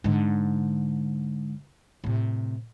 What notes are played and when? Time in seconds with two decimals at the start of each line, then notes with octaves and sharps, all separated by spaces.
0.04 G#2 D3
2.04 A2 C3